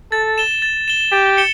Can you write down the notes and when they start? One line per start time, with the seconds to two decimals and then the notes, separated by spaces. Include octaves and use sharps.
0.12 A4 A6
0.38 E7 G7
0.62 A6
0.88 E7 G7
1.12 G4 A6
1.37 C#7 E7 G7